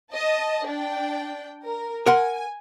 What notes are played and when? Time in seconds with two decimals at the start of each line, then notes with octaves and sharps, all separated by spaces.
0.12 D#5 A5
0.67 D4 G5
1.63 A#4
2.06 A#4 F#5 G#5 C6